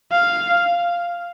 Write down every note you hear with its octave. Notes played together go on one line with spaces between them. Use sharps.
F5